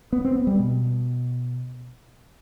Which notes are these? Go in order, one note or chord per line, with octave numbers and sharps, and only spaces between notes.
B3
C4
B3
G3
B2